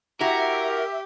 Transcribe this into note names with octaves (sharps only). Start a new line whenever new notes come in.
E4 F#4 G4 A#4 E5